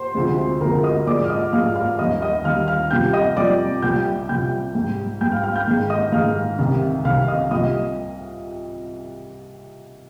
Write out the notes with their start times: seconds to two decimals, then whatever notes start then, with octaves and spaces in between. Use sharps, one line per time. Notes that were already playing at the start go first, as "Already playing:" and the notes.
Already playing: C5 C6
0.15 D2 C3 F3 G#3
0.61 D2 C3 F3 G#3 A#4 A#5
0.83 D#5 D#6
1.07 G#2 F3 G#3 D5 D6
1.24 F6
1.29 D#5 D#6
1.52 G#2 F3 G#3 F5 F6
1.75 F5 F6
1.99 D#2 D#3 G3 D#5 D#6
2.22 D#5 D#6
2.44 D#2 D#3 G3 F5 F6
2.67 F5 F6
2.90 F2 C3 G3 G5 G6
3.13 D#5 D#6
3.37 F2 C3 G3 D5 D6
3.82 C2 A#2 G3 G5 G6
4.29 C2 A#2 G3 G5 G6
4.75 G#2 G3
5.21 G#2 G3 G5 G6
5.32 F5 F6
5.44 F5 F6
5.55 G5 G6
5.67 G#2 D#3 G#3
5.90 D#5 D#6
6.12 G#2 D#3 G#3 F5 F6
6.58 C2 C3 D#3
7.05 C2 C3 D#3 F5 F6
7.28 D#5 D#6
7.51 C2 A#2 G3 D#5 D#6